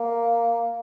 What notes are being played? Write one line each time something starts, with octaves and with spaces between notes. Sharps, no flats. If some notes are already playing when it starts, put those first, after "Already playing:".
Already playing: A#3